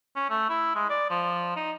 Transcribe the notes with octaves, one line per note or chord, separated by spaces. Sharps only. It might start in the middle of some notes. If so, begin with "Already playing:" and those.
C#4
A3
E4
G#3
D5
F3
D#4